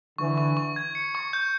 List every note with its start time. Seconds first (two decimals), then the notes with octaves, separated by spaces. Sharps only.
0.18 D3 E3 C#6
0.38 C#6
0.57 C#6
0.76 G#6
0.95 C#7
1.15 C#6
1.33 G6